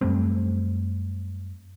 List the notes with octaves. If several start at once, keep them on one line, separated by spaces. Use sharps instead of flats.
F#2 G3 A3 C4